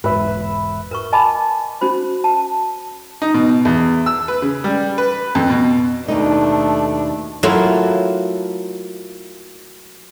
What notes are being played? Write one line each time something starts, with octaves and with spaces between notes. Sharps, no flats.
E1 G#2 B4 E5
A#4 B4 C#6
D#5 G#5 A5 B5 D6
C#4 F#4 C5 B5
A5
D#4
B2
E2
E6
B4
C#3
G3
B4
F2
B2
D#2 B2 A3 D4 D#4
F#3 A3 A#3 E4 F4